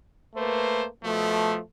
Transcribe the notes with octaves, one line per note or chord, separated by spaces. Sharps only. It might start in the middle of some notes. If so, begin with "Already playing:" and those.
A3 A#3 B4 C5
B2 F3 A3